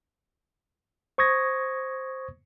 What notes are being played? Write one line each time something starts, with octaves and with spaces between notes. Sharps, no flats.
C5 C#6 D#6 G#6 A#6